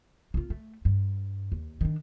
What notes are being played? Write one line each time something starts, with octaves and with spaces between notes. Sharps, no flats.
A#3 F4
A3
G2
D#2
D#3 D4